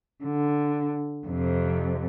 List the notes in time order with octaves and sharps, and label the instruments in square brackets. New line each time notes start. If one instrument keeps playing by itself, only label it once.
[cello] D3
F2 C3